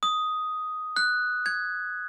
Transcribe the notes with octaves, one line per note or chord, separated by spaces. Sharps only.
D#6
F#6
G#6